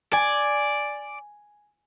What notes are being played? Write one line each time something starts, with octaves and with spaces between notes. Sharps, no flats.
D5 G#5